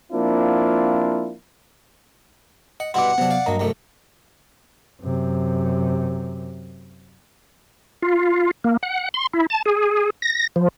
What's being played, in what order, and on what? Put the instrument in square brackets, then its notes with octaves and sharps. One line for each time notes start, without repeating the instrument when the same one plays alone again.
[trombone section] F3 A#3 C4 D4 E4 F4
[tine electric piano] D#5 [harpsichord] F#5
[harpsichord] G2 B2 E4 [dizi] F#5 [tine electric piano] C6 D6
[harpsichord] C3 D4 [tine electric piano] F#3 B3
[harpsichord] D5 F5
[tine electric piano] G2 D#5 A#5 [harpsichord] F#3 A#3
[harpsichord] C2 F#2 A3
[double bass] F#2 C3
[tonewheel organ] F4
A#3
F#5
C6
E4
A5
G#4
A#6
F3